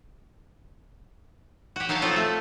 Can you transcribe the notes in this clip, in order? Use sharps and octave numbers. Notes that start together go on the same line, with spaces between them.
F#4 G4
F#3 D#4 C#5 F5 A5
F3 C4 D#4 F4 A4 C5
A3